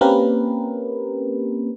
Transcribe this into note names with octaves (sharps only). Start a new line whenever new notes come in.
A#3 C4 C#4 G4 A#4 B4